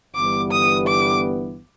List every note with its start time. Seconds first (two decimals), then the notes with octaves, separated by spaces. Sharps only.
0.15 G1 G2 E3 G3 B3 D6
0.52 D#6
0.87 D6